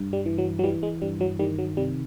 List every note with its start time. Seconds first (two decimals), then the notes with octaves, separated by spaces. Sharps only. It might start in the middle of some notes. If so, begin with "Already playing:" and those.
Already playing: G2
0.13 G3
0.26 E3
0.38 F#3
0.59 F#3
0.64 E3 G3
0.83 G#3
1.02 G2 G3
1.21 F#3
1.39 D#3 G3
1.58 F#3
1.77 C3 G3